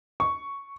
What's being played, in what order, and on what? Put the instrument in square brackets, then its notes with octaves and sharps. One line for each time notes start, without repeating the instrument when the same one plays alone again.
[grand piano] C#6